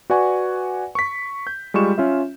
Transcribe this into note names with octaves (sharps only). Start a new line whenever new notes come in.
F#4 B4 D5 F#5 G#5 C#6
C#6 B6
G6
G3 G#3 F4 C#6 E7
C#4 F4 E5